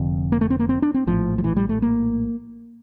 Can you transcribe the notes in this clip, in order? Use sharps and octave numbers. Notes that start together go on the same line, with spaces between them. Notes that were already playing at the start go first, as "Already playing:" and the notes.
Already playing: F1 F2 D3
A#3
A3
C4
A#3
C4
D4
C4
A#1 A2 F3
F3
E3
G3
A3
A#3